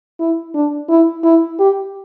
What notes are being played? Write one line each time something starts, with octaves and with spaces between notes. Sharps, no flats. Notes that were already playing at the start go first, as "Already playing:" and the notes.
E4
D4
E4
E4
G4